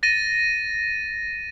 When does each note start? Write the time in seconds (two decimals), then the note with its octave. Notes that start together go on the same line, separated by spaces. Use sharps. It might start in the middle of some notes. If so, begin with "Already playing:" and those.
0.03 A6 A#6 D#7